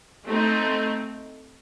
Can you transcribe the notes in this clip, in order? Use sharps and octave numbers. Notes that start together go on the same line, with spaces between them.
A3 C4 D#4